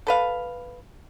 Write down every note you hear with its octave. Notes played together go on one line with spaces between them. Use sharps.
A4 B4 F5